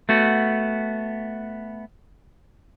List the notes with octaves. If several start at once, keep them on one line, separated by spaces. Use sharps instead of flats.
A3 B3 F#4